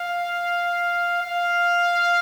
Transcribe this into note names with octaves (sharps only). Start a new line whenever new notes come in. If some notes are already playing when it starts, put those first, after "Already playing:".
Already playing: F5
F5